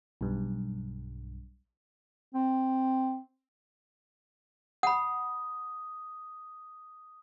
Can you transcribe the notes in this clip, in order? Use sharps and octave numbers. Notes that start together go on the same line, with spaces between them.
B1 G2
C4
F#5 B5 D#6